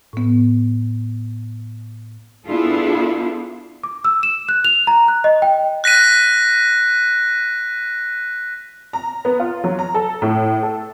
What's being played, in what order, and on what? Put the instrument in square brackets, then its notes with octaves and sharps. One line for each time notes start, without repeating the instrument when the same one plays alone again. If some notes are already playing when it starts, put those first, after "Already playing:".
[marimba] A2 B3
[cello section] B3 D4 E4 F4 G#4 A4
[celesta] D6
E6
E7
F#6
F7
A#5
F#6
D#5
G5
[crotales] F#6 A#6 B6 D#7
[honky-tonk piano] A#5
B3
F4
F#3
A#5
A4
A2
A4